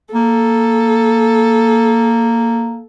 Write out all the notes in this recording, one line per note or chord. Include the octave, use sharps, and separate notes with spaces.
A#3 A4